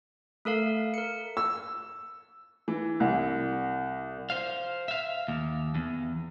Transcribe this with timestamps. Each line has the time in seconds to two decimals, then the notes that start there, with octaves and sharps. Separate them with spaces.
0.45 A3 A4 A#4 F5
0.94 A#4 C#7
1.37 E6
2.68 E3
3.00 C2
4.30 C5 F5
4.88 E5 F5
5.28 D#2
5.75 E2